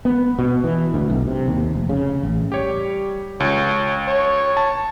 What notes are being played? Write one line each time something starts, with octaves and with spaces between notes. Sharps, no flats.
B3
B2
E3
D2
B1
C3
D#2
F1
C#3
A1
G3 G4 C#5
C#2 C#5
C#5
A5